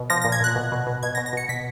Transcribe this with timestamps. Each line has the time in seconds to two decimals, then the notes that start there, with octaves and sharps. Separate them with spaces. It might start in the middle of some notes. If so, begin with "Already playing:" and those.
Already playing: B2
0.10 F3 A#6
0.22 A#2 A#6
0.32 G#6
0.40 A#2 F#6
0.56 B2
0.72 B2
0.87 B2
1.03 B2 G#6
1.15 A#6
1.18 B2
1.26 A#6
1.33 B2 C#7
1.49 B2 B6